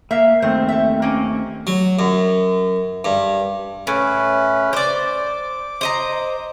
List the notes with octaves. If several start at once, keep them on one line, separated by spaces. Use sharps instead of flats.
A#3 E5 F5
D#2 A3 C4 C5
A4 E5
A#3 C#4
F#3
F#2
G2
A2 C#4 B4
C5 D5 D6
C5 D#5 A#5